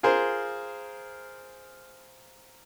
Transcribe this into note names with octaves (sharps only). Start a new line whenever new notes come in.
F4 G#4 A#4 C5